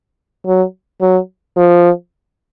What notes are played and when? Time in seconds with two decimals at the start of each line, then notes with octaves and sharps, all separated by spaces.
0.46 F#3
1.01 F#3
1.57 F3